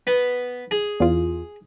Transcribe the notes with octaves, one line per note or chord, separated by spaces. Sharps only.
B3
G#4
E2 F4